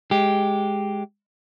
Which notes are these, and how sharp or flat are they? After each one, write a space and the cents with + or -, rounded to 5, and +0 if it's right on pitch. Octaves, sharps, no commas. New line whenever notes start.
G#3 +0 G4 +0